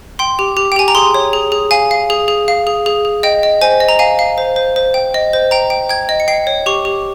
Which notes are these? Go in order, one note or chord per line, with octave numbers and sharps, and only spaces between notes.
G5 C6
G4
G4
G5
G4 G#5
A#5
G#4 C6
C#5
G#4
G#4
F5 G#5
F5
G#4
G#4
F5
G#4
G#4
G#4
D#5 G5
D#5
C5 G#5
D#5
A#5
F5 G#5
F5
C5
C5
C5
G5
D#5
C5
G5 A#5
G5
G5 G#6
D#5
C#7
G5 C7
C#5
G4 C#6
G4